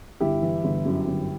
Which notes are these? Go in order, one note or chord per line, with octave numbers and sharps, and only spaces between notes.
G1 E4 G4
E3
G1
F#2
G1